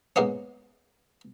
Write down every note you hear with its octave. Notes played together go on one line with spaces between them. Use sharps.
G#2 A#3 B3 C#4